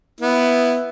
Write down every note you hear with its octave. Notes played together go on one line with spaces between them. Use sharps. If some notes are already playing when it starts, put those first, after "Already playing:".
B3 E4